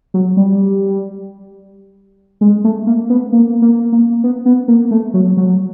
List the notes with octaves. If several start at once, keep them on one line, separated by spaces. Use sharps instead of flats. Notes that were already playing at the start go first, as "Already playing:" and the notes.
F#3
G3
G#3
A3
A#3
B3
A#3
A#3
A#3
B3
B3
A#3
A3
F#3
F#3